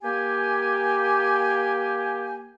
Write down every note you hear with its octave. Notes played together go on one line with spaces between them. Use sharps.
A#3 G4 G#5